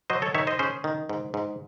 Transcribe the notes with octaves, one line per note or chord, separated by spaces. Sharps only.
F#3 C5 D#5
A4 C#5
D#3 C#5 E5
C5 D#5
C#4 G#4 C5
D#3
G#2
G#2